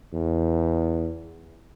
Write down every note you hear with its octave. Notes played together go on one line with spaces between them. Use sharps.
E2